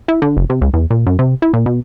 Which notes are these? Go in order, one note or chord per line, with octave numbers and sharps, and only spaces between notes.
E4
D3
F#1
C3
C#2
E2
A#2
F#2
C3
E4
A#2
B2